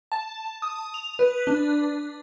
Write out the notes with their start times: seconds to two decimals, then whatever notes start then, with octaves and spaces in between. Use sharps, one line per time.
0.12 A5
0.62 D#6
0.94 F7
1.19 B4
1.47 D4